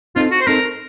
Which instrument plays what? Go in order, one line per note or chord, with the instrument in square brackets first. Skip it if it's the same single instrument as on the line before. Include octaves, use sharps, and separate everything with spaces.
[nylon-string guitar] C4 D#4 A4 [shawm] F4
[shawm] F#4
C5
[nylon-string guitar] C4 D#4 A4 [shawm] A#4